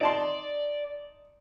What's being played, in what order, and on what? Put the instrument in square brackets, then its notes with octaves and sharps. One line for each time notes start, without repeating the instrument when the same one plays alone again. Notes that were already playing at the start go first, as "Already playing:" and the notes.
[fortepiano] D#4 A5 C6 [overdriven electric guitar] D5